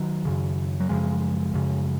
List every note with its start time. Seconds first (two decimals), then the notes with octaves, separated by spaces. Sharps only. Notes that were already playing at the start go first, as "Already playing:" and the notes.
Already playing: D#3 F#3
0.25 F#2 C#3
0.80 F#3
0.89 F#2 C#3 F3 G#3
1.54 F#2 C#3